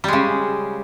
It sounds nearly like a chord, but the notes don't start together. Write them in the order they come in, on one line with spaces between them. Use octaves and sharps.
G3 G#3 C#3